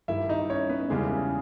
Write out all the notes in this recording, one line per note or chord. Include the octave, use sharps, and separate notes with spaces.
G2 D#3 G3 E4 E5
D#4 D#5
C#4 C#5
B3 B4
E2 C#3 E3 G3 G#3 G#4